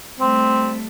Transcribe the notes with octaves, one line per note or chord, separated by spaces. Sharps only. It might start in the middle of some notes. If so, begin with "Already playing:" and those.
G3 A3 C4